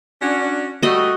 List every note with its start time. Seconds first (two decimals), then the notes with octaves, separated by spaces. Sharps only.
0.21 C#4 D4 F#4
0.83 G3 A3 F#4 D#5